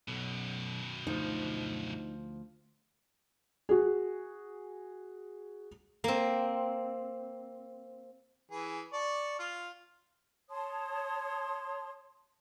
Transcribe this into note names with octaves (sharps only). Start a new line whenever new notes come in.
B1 F#2 B2
D2 F3 D#4
F#4 G#4
A#3 C4
E3 G#4
D5 A5 C#6
F4 F6
C#5 A5 C6 D#6